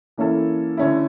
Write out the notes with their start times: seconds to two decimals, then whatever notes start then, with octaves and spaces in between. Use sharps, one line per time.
0.17 E3 A#3 C#4 E4 A4
0.77 D3 A3 C#4 E4